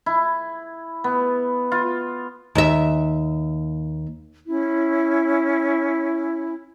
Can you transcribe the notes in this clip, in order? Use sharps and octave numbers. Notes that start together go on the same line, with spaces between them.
E4
B3
F4
D#2 E5
C#4 E4